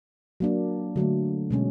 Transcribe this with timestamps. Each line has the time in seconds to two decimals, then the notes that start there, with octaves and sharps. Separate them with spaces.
0.40 F#3 A#3 D4
0.96 D3 F#3 A3
1.51 B2 G#3 C#4